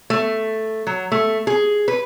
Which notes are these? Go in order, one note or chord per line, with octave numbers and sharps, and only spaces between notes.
A3
F#3
A3
G#4
B4